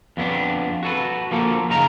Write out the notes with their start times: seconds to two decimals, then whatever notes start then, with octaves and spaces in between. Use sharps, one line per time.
0.17 F2 B3 C#4 D4
0.83 F#4 A4 B4
1.31 F3 A#3 A4
1.70 F#2 C#3 D#4 A#4 A#5